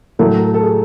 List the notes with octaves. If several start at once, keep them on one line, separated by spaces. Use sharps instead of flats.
A2 F#3 A3 A#4
A4
A4
G#4